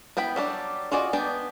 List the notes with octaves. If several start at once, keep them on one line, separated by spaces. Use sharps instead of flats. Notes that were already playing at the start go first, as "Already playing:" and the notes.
B3 E4 G5 B5
F#3 G3 D4
F4 F#4 G#4 D5 D#5
B3 D4 G#4 D5 G5